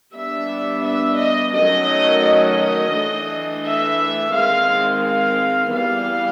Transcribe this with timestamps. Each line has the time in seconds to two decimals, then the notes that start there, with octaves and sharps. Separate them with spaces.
0.14 G3 B3 D4 E5
0.84 E5
1.19 D#5
1.54 D#3 F#3 A3 C#4 D#5
2.23 D#5
2.93 E3 A3 D4
3.64 E5
4.33 D#3 G#3 C4 F5
5.04 F5
5.72 E3 G3 B3 F5